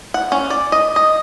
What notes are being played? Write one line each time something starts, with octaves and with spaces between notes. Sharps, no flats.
F#5
C#4
D5
D#5
D#5